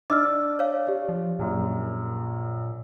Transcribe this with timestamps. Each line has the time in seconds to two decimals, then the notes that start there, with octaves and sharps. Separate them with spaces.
0.10 D4 D#5 D6 E6 F6
0.59 C#5 F5
0.87 G4 D5
1.09 F3
1.39 A#1 F#2 A#2